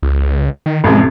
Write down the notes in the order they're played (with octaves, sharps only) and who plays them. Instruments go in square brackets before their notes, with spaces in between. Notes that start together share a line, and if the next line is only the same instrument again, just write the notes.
[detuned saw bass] C#2
D#3
[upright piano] A1 F2 C3 [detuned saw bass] G#3